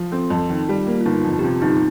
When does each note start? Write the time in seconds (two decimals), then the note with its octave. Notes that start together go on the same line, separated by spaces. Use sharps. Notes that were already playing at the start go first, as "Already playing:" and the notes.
Already playing: F3
0.12 C4 F4 A4
0.30 F2
0.50 D#3
0.68 G3 F4
0.87 A#3
1.01 F4
1.06 G1 D#4
1.24 F2 F4
1.39 G4
1.44 C3 F4
1.62 G1 D#4